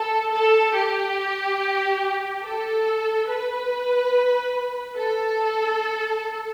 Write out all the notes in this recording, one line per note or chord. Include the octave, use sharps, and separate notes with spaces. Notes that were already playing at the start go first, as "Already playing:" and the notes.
Already playing: A4
A4
G4
A4
B4
A4